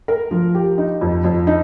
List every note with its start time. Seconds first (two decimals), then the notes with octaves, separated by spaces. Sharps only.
0.08 A#4
0.31 F3
0.55 G4
0.78 D#4
1.01 F2
1.24 F2
1.47 D#4